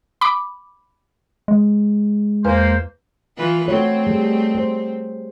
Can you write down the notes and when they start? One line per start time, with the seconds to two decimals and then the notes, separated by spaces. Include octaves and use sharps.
0.21 B5 D6
1.48 G#3
2.45 E2 A#3 B4 C5
3.37 E3 F4 B4
3.68 A3 C4 F#4 C#5
4.07 G3 G#4
4.55 C5